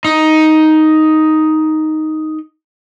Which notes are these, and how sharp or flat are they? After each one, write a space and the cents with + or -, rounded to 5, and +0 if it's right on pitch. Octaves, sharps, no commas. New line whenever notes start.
D#4 +5